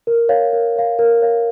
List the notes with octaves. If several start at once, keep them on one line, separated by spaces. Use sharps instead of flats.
A#4
C#5 F5
A#4
C#5 F5
A#4
C#5 F5